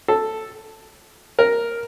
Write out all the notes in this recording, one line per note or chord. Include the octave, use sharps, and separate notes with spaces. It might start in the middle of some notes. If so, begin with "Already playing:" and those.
A4
A#4